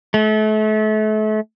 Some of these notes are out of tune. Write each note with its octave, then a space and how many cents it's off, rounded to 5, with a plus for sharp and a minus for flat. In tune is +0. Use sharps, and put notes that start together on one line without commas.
A3 -35